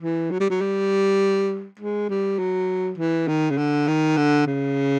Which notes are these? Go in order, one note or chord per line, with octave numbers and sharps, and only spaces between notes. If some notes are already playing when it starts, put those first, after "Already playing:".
E3
F#3
G3
F#3
G3
G#3
G3
F#3
E3
D#3
C#3
D3
D#3
D3
C#3